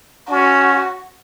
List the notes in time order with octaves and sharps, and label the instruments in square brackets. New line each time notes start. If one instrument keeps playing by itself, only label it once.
[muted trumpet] C#4 [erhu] F#4